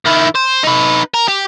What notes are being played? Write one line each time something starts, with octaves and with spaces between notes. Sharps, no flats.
D#3 E4
C5
D#4 B4
A#4
G4